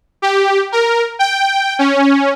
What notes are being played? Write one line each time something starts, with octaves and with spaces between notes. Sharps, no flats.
G4
A#4
G5
C#4